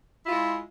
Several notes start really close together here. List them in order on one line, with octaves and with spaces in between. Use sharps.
E4 F4 G#3